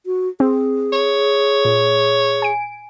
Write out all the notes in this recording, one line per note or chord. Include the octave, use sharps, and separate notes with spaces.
F#4
C4 G#4
C#5
A#2
G#5 D7